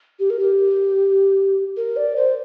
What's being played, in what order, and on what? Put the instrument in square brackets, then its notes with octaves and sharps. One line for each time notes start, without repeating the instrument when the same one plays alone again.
[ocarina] G4
A#4
G4
A#4
D5
C5